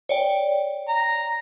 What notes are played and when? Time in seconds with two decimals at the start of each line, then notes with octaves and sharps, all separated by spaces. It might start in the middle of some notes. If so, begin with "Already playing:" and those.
0.09 C#5 D5 G5
0.88 A#5